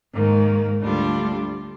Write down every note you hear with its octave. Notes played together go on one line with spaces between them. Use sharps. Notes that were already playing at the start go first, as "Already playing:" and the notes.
G#2 D#3 A#3
D2 D3 G3 D4 F4